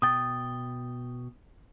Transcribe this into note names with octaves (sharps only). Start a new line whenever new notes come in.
B2 G5 D#6 A6